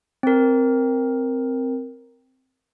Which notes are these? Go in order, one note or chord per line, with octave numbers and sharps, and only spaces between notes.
C4 A#4